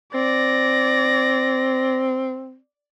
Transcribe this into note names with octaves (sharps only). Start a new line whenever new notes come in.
C4 D5 A#6